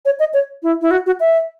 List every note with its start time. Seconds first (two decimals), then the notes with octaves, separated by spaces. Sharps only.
0.05 C#5
0.19 D#5
0.34 C#5
0.63 E4
0.81 E4
0.91 F#4
1.06 F#4
1.20 E5